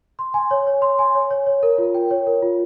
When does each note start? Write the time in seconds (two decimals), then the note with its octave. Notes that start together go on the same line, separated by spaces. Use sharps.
0.19 C6
0.34 G#5
0.51 C#5
0.67 C#5
0.82 C6
0.99 G#5
1.15 C#5
1.31 C#5
1.47 C#5
1.63 A#4
1.78 F4
1.94 G5
2.11 C#5
2.27 A#4
2.42 F4